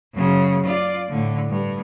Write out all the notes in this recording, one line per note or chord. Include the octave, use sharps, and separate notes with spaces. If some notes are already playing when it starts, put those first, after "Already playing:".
F#2 C#3
F4 D5
A2 D3
G2